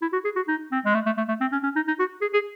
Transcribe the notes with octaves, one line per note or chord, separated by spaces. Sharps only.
E4
F#4
G#4
F#4
D#4
C4
G#3
A3
A3
A3
A3
C4
C#4
C#4
D#4
D#4
F#4
G#4
G#4